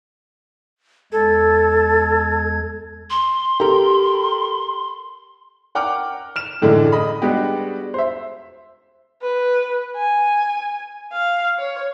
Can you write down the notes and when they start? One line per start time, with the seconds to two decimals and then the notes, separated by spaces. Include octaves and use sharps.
1.12 E2 G#3 A4 G#6
3.10 C6
3.60 G4 A4 A#4
5.75 A#4 F#5 G5 D6 F6
6.36 F6 E7
6.62 F#2 A2 D3 E3 G#3
6.92 D#5 B5
7.22 G3 G#3 B3 D4 F#4 G4
7.94 C5 E5
9.22 B4
9.97 G#5
11.13 F5
11.58 C#5